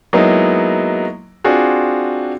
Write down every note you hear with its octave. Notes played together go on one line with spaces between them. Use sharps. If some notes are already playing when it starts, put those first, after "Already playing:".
F#3 G#3 A#3 B3 D#4 E4
C4 D4 F4 F#4 G#4